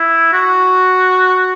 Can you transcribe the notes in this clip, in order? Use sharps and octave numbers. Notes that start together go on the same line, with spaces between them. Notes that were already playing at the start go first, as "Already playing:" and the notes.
Already playing: E4
F#4